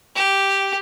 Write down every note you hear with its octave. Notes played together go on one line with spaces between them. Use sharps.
G4